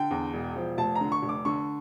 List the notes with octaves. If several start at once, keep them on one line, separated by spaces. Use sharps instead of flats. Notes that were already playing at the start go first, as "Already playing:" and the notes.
Already playing: D3 G5
E2
E1
F3
F1 A5
A#5
D3
C#6
F1
D6
D3 C#6